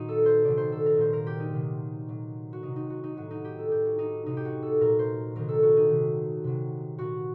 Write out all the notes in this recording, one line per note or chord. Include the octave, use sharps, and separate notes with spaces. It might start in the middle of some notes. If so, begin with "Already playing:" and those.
Already playing: A#2 D#3 F#3 D#4 F#4
A4
C5
C3 D#3 F#3 D5
C5
A4
A#4
A#2 F#3 C5
A#4
G4
D#4
C3 D#3 F#3
A#2 F#3
F#4
C3 F#3 D#4
D#4
F#4
D#4
A2 F#3 F#4
D#4
G4
A4
A2 F#3 G4
F#4
D#4
C3 F#3 D#4
G4
F#4
A4
A#2 F#3 A#4
C5
C3 D#3 F#3 A#4
A4
F#4
D#4
C3 D#3 F#3
C3 F#3
A#2 F#3 F#4